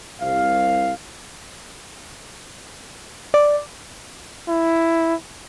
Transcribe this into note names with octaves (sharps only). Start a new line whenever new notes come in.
C2 F5
D5
E4